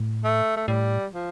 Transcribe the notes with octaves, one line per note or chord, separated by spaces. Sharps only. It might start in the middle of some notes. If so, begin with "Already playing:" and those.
Already playing: A2
A3
A3
A2 G3
F3